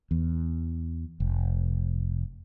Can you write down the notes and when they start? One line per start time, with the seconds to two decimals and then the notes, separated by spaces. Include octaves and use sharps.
0.11 E2
1.20 F1